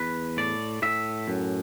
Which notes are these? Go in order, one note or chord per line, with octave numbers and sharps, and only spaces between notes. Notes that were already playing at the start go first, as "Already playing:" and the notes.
Already playing: E2 B4
A2 D5
A2 E5
F#2